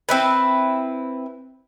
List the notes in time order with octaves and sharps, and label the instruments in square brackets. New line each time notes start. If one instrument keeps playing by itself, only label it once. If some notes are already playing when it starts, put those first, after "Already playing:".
[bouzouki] C4 E4 B4